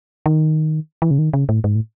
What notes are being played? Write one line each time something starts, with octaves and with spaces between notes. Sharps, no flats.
D#3
E3
C#3
D#3
C#3
A2
G#2
A2